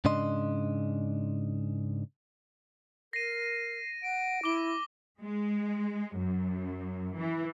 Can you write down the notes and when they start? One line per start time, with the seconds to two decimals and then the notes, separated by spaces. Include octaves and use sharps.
0.05 G#2 C#3 D4 D#5 C6
3.13 A#4 A#6 C7 D#7
4.03 F#5 D7
4.44 E4 D6 G7
5.22 G#3
6.17 F#2
7.18 E3